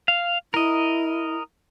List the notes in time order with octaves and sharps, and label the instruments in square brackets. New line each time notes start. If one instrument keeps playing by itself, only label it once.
[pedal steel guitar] F5
[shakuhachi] E4 [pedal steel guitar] A#4 D#5